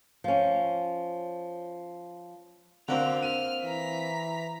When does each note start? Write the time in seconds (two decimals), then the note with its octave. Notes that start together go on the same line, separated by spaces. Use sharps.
0.24 F3 C#4
2.88 D3 A#3 C4 F#4 C5 F7
3.23 F6 D#7
3.64 E3 A#5 B6